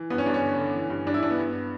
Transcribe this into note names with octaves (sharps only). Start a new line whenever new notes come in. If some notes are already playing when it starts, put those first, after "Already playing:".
Already playing: E3
G2 B3
C#4
G2 D4
C#4
D3
D3
E3
G2
G2 D4
E4
G2 D4
B3
G2